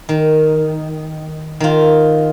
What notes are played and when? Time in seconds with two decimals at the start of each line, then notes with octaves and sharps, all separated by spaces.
0.09 D#3
1.60 D#3 F4